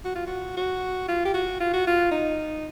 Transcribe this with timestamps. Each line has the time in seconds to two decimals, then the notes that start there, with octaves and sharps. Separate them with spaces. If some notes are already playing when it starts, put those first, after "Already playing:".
0.05 F#4
0.15 F4
0.27 F#4
0.57 F#4
1.08 F4
1.25 G4
1.34 F#4
1.60 F4
1.74 F#4
1.87 F4
2.11 D#4